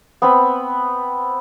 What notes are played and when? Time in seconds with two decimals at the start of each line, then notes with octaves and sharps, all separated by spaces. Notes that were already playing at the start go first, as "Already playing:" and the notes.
0.22 B3 C4 B5